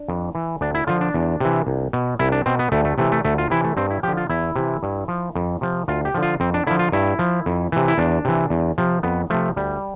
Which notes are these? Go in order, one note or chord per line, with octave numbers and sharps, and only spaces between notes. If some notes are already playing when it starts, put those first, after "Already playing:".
Already playing: D4
F2
E3
D2 D4
E4
D3 F3 F4
D4
E2
C3 E3
C2
B2
C2 E4
D4
B2 C4
B3
D2 A3
A3
C3 E3 A3
A3
D2 A3
F4
C3 E3 E4
A3
G2 C4
E4
D3 F3 G4
F4
E2 E4
C3 E3
G2
F3
F2
C3 F3
D2 F4
G4
D3 F3
F4
F2 C4
D4
D3 F3 E4
F4
G2 E4
F3
F2
C3 E3
E4
E2 D4
C3 E3
E2
C3 F3
F2 B3
C3 F3 A3
D2 G3